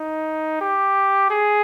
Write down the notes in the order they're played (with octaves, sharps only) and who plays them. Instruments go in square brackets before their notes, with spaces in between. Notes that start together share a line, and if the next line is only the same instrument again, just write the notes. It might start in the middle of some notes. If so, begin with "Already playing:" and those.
Already playing: [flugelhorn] D#4
G4
G#4